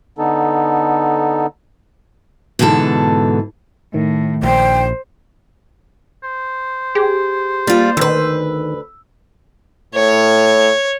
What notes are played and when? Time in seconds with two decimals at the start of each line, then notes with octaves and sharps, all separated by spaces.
0.18 D3 B3 D#4 A4
2.59 G#2 B2 D3 E3 A4
3.94 A2 D#3
4.43 A#1 C5 G5
6.23 C5
6.95 G4 G#4
7.67 G3 A#3 F4 A6
7.97 D2 D#3 B4 E6
9.95 A2 C#5